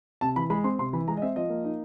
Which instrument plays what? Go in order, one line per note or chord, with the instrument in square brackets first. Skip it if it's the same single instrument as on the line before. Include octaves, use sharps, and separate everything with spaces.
[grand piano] C3 A5
E3 B5
G#3 B5
C4 C6
C3 C6
E3 B5
G#3 A#5
D#5
C4 E5
F3 D#5
A#3
D#4